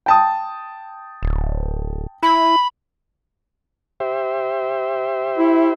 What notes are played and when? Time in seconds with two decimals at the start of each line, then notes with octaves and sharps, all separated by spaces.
0.06 G5 A5 D#6
1.23 D1
2.23 E4 B5
4.00 G4 C5 E5
5.38 E4